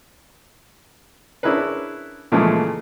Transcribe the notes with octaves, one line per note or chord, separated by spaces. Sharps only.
C#4 D4 E4 G#4 A#4 B4
A#2 C#3 E3 F3 G#3 A3